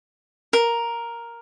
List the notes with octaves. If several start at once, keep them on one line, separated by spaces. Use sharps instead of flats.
A#4